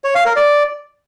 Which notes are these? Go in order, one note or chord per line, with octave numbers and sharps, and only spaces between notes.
C#5
F5
A#4
D5